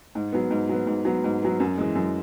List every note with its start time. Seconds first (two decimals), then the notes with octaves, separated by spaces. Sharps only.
0.15 G#2
0.33 F#3 B3
0.51 G#2
0.69 F#3 B3
0.87 G#2
1.05 F#3 B3
1.24 G#2
1.42 F#3 B3
1.60 F#2
1.78 E3 G#3
1.95 F#2